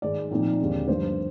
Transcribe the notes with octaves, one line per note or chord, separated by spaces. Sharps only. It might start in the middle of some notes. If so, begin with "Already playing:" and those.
G#2 D#3 G#3 D5
A#2 F3 C4 D#4
D#2 D3 G#3 C4
G2 F3 A#3 C5